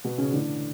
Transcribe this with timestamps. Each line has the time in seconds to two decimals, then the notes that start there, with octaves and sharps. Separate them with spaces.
0.04 B2 B3
0.18 C#3 C#4
0.32 A2 D3 E3 D4